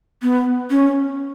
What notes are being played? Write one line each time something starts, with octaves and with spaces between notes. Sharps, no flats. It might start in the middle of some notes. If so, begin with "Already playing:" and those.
B3
C#4